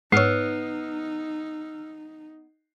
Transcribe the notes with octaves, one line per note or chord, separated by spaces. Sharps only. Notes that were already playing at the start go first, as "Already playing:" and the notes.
G#2 B3 D#4 C#5 E6 F6 C7